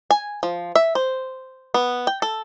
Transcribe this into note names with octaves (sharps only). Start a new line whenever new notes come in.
G#5
F3
E5
C5
B3
G5
A4